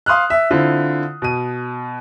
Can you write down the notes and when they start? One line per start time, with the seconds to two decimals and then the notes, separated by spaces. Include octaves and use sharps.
0.06 F5 C6 D#6 F6 F#6
0.30 E5
0.51 D3 C4 E4 F4
1.22 B2 D#7